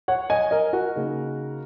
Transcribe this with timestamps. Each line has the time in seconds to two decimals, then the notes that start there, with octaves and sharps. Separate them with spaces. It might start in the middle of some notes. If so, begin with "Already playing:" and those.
0.08 C#5 F#5
0.30 D#5 G#5
0.51 A#4 D#5
0.73 F#4 A#4
0.96 C#3 A#3 D#4